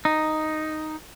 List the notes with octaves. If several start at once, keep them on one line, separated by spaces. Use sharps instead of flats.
D#4